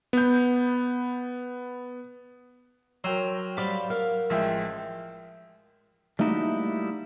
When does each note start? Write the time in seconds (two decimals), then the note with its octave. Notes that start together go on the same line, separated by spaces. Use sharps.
0.13 B3 G6
3.04 F#3 A#4 G5 C6 E6
3.57 G3 C5 D5 F5 F#5 A#5 B5
3.90 A#4 F5
4.30 A1 F3 G#3 C5 E5 G5
6.19 G3 A3 A#3 D#4 E4 F#4